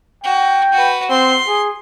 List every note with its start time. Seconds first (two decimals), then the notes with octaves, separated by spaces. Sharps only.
0.24 F#4 G5
0.73 F#4 B4
1.10 C4 C6
1.48 G#4